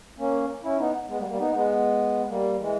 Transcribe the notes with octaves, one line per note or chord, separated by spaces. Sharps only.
A#3 C#4
C#4 E4
B3 D#4
G#3 B3
G3 A#3
G3 A#3
B3 D#4
G#3 B3
G3 A#3
E3 G#3